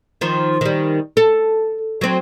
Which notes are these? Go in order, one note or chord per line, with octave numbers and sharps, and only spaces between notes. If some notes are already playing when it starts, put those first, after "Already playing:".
D#3 F3
D#3 G3
A4
F#3 C4